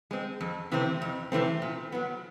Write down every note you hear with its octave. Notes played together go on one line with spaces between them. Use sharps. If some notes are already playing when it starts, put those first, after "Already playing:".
G#3 C4
F2
C3 E3 A3 C4
F2
C3 E3 A3 C4
A#2
F#3 B3